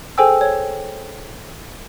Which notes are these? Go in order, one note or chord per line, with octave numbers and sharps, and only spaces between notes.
G#4 A4 C5 G5 G#5 E6
C#5